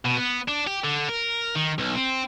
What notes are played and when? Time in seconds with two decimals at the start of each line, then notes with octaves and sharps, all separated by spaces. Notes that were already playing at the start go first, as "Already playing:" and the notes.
0.05 B2
0.17 B3
0.48 D4
0.67 G4
0.84 D3
1.09 A#4
1.55 D#3
1.78 B1
1.96 C4